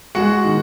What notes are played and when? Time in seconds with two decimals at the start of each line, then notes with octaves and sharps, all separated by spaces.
0.15 G#3 F#4 F#5
0.45 D#3